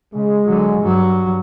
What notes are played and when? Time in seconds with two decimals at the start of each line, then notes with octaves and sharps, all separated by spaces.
0.14 C#3 G#3
0.45 D3 F#3
0.81 G2 F#3